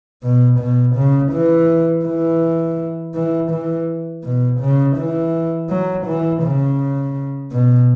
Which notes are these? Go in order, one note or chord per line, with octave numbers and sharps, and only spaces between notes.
B2
B2
C#3
E3
E3
E3
E3
B2
C#3
E3
F#3
E3
C#3
B2